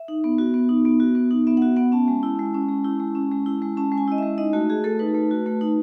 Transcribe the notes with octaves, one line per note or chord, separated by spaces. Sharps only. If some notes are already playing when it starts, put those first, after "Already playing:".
Already playing: E5
D#4
B3
F#4
B3
D#4
B3
F#4
B3
D#4
B3 E5
F#5
F#4 E5
B3 F#5
C#4 A5
G#3
E4
G#3
C#4
G#3
E4
G#3
C#4
G#3
E4
G#3
C#4 A5
G#3
G#5
E4 D#5
G#3 E5
D#4 D#5
A3 F#4
F#4 G#4
A3 A4
D#4 B4
A3
F#4
A3
D#4